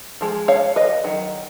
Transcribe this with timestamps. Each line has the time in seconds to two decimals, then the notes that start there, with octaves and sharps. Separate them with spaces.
0.21 F3 G#3
0.48 C#5 F5
0.76 B4 D#5
1.04 D#3 F#3